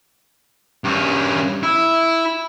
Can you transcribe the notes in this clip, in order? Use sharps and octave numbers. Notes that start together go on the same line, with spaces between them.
G2 C#4
E4